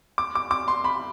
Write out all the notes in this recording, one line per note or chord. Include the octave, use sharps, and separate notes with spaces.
D6
D6
D6
C6
B5